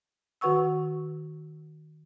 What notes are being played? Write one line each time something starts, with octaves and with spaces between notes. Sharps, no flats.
D#3 F#4 B4 F#5 C#6 E6